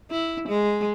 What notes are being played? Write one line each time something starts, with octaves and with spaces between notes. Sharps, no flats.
E4
G#3